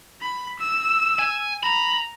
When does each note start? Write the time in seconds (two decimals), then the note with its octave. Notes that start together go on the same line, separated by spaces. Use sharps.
0.21 B5
0.59 E6
1.19 G#5
1.63 A#5 B5